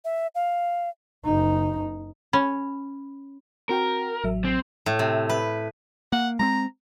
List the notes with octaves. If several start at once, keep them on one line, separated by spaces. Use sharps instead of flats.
E5
F5
F#1 D#4
C#4 B5
C4 F#4 A#4 G5
A1 F#3 E5
C4
A2
C3
B4
A#3 F#5
G#3 A#3 C4 A#5